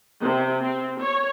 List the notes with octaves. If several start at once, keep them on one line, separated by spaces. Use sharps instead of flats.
C3
C4
C#5